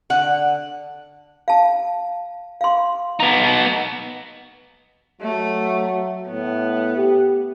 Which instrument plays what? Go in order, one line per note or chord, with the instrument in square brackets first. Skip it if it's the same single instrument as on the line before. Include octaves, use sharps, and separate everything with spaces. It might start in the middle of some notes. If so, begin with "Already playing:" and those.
[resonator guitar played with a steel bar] D3 F#5
[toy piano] F5 A5
F5 C6
[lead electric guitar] B3 D#4
[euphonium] F#3 [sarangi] A3
[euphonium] A2 [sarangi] B3
[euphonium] G4